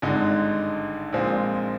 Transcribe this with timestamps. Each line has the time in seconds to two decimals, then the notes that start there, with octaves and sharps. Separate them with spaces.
0.02 G#1 G2 D3 G#3 D#4
1.13 A#1 A#2 F3 G#3 C4